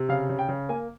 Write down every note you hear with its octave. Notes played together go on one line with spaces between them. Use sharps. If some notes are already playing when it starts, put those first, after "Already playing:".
Already playing: C3
C#3 F5
C#3
G5
C#3
A#3 G#5